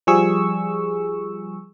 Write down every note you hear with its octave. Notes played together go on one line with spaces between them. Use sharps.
F3 G3 G#4 C#6 E6